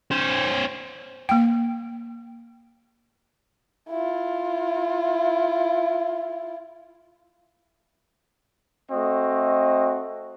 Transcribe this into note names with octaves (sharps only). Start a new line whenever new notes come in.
C#4 C5
A#3 G5
E4 F4
A3 C4 F#4 D#5